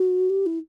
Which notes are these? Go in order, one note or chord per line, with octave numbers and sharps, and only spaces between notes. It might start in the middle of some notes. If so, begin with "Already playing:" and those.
Already playing: F#4
G4
E4